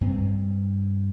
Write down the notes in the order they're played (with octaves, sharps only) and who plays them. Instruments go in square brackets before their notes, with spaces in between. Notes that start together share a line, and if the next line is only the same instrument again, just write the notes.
[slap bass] G2 C4